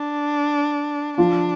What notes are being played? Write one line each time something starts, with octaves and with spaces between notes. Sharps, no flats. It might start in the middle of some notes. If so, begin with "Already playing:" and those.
Already playing: D4
F3 D4 F4